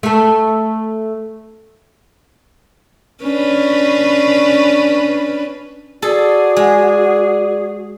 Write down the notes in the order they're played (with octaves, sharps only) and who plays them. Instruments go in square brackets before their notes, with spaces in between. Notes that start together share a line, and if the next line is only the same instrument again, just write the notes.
[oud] A3 A4
[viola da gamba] C#4 D4 B4
[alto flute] F#4 [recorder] G#4 [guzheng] A4 [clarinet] D5
[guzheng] G#3